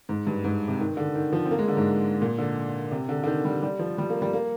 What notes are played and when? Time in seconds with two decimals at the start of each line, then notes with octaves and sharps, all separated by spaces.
0.09 G#2
0.27 G2
0.44 G#2
0.68 C3
0.80 D#3
0.97 D3
1.15 D#3
1.33 F3
1.46 C4
1.51 A#3
1.59 G#3
1.68 D3
1.77 G#2
2.22 A#2
2.38 D3
2.91 C3
3.09 D3
3.24 D3
3.27 D#3
3.45 G3
3.63 G3
3.79 F3
3.98 G3
4.10 A#3
4.22 G3
4.33 A#3